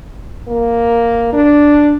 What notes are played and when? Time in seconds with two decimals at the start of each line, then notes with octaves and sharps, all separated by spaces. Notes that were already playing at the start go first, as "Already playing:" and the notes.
0.48 A#3
1.33 D4